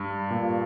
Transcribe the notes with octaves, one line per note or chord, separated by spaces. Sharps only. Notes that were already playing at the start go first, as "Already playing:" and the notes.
Already playing: G2
A#2